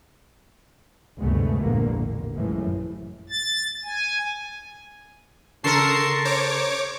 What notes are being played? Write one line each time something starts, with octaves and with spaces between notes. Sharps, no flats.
D2 G2 C3 G#3 A3 B3
A#1 E2 D3 A#3
A1
A1 F#2 A2 E3 F3 G#3
A6
G#5
C#3 A4 A#4 A5 C6 C#6 C7
C5 C#5 A#5 D6